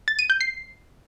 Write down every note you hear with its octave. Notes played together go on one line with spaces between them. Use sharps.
A6
D#7
G6
C7